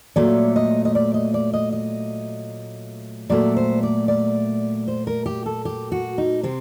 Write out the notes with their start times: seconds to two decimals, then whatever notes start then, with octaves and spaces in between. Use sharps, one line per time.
0.16 A#2 F#3 A3 D5
0.56 D#5
0.85 D#5
0.95 D5
1.14 D#5
1.34 D5
1.53 D#5
1.72 D#5
3.29 A#2 F#3 A3 D5
3.57 C5
3.83 D5
4.08 D5
4.88 C5
5.07 A#4
5.26 G4
5.46 A4
5.65 G4
5.92 F#4
6.18 D#4
6.43 C3 C4